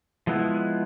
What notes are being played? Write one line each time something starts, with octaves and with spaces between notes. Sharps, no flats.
F3 G#3 B3 E4